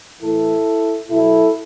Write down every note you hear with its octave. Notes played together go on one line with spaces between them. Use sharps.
A2 E3 E4 A4
B2 F#3 E4 A4